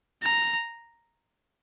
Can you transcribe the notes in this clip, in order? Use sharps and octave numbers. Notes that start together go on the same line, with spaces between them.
A#5